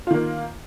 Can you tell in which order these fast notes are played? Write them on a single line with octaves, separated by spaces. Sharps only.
F4 D#3 A#3